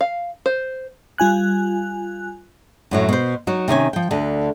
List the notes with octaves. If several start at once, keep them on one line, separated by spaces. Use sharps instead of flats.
F5
C5
G3 F4 G#5 F#6
F#2 A2 F#3
B2 C5
F#3 D#4 F#4
C3 D#3 C#4 G#5
F3 G5
D2 D3